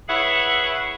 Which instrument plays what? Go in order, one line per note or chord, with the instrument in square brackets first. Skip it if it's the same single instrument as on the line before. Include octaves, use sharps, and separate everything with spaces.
[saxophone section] E4 G#4 B4 C#5 E5 F#5